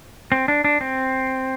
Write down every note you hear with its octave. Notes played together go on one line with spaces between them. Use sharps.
C4
D4
D4
C4